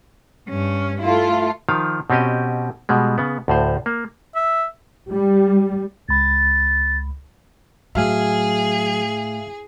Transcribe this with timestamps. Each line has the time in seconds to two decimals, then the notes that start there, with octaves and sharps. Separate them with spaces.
0.49 G2 C#4
1.02 A3 E4 F4
1.69 D#3 F3 F5
2.10 B2 C4 C#4 G4 D#5
2.89 B2 G3 G#3
3.18 C#3 B3
3.48 D2 A2 C5
3.86 A#3
4.35 E5
5.11 G3
6.09 C#2 B5 A6
7.95 A2 F#3 G#4 E5 F5 G#5